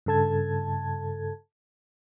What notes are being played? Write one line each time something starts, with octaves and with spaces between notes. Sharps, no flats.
G2 C#3 A4 A5 G#6